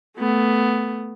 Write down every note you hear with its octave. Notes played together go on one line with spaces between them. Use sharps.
A3 B3